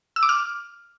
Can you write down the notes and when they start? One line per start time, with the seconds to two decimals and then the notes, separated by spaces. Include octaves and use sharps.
0.16 E6
0.23 D6
0.29 F6